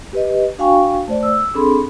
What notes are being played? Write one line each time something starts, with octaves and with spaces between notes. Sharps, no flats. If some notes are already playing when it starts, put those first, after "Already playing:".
G4 B4 D#5
D4 F#4 F5 G5 G#5 C#6
A3 C5 D5
E6
C4 D4 G#4 A4 B5 C6